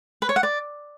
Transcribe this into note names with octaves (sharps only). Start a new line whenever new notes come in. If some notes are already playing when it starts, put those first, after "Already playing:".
B4
C#5
F#5
D5